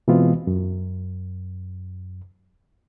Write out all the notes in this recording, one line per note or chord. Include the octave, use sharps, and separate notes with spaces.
B2 E3 G#3 B3 C4 F4
F#2